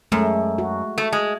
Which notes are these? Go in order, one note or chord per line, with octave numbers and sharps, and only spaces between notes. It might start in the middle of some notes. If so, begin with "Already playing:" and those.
F#2 G#3 A3
F#4
A3
G#3